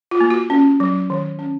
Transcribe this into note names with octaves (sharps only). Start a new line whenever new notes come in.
F4
A#3
F#4
C#4
F#3
D#3
C#4